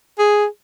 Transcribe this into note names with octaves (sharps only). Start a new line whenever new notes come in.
G#4